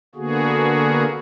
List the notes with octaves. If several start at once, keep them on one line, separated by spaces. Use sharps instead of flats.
D3 A#3 B3 F#4 G#4